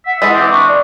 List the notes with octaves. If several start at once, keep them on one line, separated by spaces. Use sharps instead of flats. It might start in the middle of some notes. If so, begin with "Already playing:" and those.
E5 F#5
E3 G#3 A4
C4 D6
D4 C#6
D5